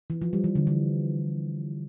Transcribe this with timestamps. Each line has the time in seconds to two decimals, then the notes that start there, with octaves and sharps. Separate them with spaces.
0.10 E3
0.22 F3
0.33 G3
0.44 E3
0.55 D3
0.67 E3